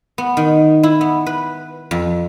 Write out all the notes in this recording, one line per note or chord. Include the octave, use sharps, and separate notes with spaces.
B3
D#3
E4
B3
B4
F2